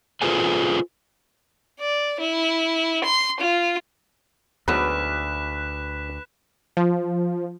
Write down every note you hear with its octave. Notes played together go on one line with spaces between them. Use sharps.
F4 G#4 A4 B4 C5 G#5
D5
E4
C6
F4
D2 G#2 F#3 B3 B4 F#6 B6 E7
F3